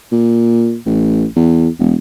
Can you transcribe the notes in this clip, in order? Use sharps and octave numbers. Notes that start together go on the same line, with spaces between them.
A#2
A1
E2
E1